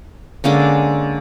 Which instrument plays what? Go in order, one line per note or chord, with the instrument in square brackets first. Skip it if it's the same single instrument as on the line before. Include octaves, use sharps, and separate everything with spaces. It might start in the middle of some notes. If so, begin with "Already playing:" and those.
[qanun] D3 G#3 A#3 C#4